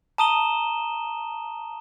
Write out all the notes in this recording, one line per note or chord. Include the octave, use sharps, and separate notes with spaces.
A5 A#5 D#6 D#7 E7 G7